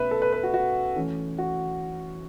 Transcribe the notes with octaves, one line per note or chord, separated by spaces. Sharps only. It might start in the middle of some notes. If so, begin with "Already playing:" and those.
Already playing: B2 A3 C#4 B4 E5
A4
B4
B4
F#4
F#4
E3 A3 C#4
F#4